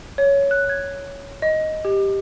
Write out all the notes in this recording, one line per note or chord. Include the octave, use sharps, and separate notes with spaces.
C#5
F#6
G#6
D#5
G4